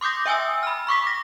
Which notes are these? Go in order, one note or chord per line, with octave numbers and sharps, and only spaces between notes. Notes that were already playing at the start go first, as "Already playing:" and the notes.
C6 D6 D#6 G6 A#6
E5 G5 G#5 D#6 E6
B5 F6
B5 C#6 D6 B6
A#6